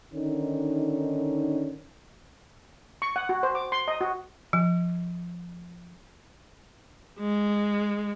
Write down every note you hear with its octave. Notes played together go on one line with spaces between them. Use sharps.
D3 D#3 C#4 D#4
C#6
F#5
F#4
C5
D6
C6
D#5
F#4
F3
G#3